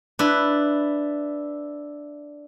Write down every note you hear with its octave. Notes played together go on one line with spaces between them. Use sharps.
D4 E4 B4